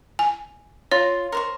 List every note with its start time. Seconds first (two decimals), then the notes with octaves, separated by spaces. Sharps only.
0.19 G#5
0.91 F4 C#5
1.32 A#4 C5 C#6